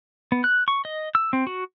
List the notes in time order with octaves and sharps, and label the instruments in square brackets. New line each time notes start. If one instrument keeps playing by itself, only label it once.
[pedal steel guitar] B3
F#6
C#6
D#5
E6
C4
F#4